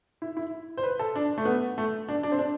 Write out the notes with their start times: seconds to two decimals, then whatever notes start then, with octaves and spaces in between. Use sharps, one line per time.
0.22 E4
0.37 E4
0.77 C5
0.83 B4
0.99 A4
1.15 D4
1.38 A3
1.45 B3
1.78 A3
2.09 D4
2.23 D4
2.32 C4
2.39 D4